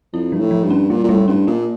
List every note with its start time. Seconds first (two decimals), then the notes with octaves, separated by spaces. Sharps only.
0.13 F2 E4
0.32 G2 F3
0.39 A2
0.51 F3
0.64 G2
0.70 C#4
0.90 A#2 G3
1.04 A#2
1.09 A2 G3
1.28 G2 C#4
1.47 A#2 A#3